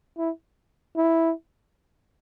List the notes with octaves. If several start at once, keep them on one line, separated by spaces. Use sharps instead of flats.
E4
E4